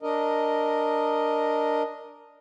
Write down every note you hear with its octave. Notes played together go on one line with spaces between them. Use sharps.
D4 A#4 D#5